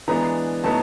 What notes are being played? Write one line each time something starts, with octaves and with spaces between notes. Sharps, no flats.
E3 G#3 B3 D4 A#5
A2 F#3 B3 D#4 A5